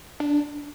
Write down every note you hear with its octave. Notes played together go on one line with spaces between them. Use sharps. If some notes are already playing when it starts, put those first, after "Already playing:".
D4